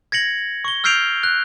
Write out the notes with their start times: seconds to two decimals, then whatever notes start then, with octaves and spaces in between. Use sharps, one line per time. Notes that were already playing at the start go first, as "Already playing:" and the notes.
0.12 G#6 A#6 C#7 F#7
0.65 C#6 G7
0.84 E6 F6 G6 C7 D7 F7
1.23 F#6